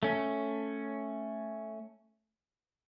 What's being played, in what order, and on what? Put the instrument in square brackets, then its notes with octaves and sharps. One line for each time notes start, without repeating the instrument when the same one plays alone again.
[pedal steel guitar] A3 C#4